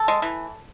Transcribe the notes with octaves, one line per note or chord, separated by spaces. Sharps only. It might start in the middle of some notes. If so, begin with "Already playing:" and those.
Already playing: A4
G#3
E3